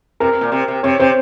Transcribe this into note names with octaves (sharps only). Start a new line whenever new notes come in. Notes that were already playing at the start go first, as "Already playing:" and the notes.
C3 A#4
A#2
C3
C3
C3 C#5
C3 C5